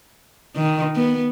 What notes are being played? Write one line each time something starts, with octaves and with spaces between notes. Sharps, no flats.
D#3
B3